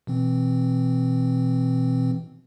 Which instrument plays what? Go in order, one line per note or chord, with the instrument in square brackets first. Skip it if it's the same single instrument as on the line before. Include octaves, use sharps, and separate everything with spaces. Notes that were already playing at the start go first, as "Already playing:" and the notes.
[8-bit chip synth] B2 E3 C4